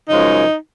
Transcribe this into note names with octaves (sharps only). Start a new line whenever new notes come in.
F#2 C#3 F3 G#3 D#4